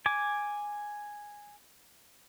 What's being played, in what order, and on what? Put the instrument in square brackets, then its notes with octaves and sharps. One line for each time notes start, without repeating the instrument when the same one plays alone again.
[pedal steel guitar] G#5 D6